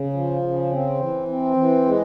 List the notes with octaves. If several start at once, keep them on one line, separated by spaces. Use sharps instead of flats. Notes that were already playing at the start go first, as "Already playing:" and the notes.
Already playing: C#3
F3
C#3
C4
E3
C4
E3
G#3